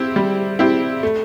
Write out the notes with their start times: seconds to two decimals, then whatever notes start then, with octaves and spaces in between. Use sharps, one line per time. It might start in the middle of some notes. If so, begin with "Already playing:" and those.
Already playing: C4 E4 G4
0.16 G3
0.59 C4 E4 G4
1.03 A3